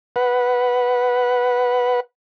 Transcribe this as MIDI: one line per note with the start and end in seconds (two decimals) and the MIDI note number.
0.16 2.00 71
0.16 2.00 78